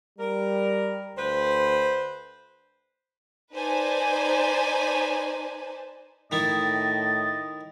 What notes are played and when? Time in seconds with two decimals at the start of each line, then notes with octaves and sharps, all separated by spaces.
0.18 G3 A#4
1.16 D2 B4 C5
3.53 D#4 B4 C5 D5 G#5 A5
6.32 A2 D#3 E4 D#5 A6